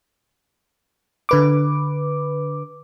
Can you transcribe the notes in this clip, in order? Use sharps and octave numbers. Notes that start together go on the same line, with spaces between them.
D3 B4 D6